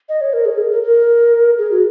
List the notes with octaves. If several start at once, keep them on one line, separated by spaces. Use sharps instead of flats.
D#5
C#5
A#4
G#4
A#4
A#4
A#4
G#4
F#4